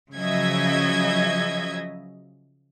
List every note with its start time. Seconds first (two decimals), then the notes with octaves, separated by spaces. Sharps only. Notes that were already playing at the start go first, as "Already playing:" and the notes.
0.14 C#3 F3 F#3 D#5 E5 G#6